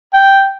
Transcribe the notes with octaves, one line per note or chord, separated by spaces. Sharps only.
G5